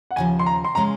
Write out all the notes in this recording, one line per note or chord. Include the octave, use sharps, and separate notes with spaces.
F#5
D#2 C#3 F3 G#5
C6
A#5
C6
C#3 G#3 C#4 A#5